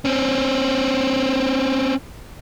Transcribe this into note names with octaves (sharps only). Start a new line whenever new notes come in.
C4 C#4